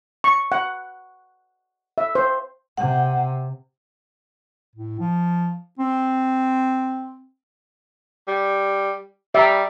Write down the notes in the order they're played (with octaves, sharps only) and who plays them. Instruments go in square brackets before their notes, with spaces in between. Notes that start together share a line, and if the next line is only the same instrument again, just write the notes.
[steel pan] C#6
F#5
E5
C5
[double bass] C3 [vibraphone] F#5
[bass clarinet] A2
F3
C4
[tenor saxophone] G3
[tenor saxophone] G3 [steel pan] E5 A#5